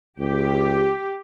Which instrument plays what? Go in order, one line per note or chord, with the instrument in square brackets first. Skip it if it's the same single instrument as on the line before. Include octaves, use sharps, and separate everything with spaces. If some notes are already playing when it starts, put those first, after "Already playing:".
[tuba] C#2 [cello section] G4